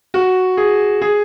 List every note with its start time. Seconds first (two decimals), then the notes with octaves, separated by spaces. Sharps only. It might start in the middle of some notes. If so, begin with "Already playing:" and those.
0.14 F#4
0.57 G#4
1.02 G#4